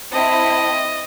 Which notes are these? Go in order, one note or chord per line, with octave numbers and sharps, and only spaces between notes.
C4 E4 D#5 A5